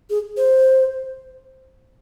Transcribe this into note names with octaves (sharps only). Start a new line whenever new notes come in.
G#4
C5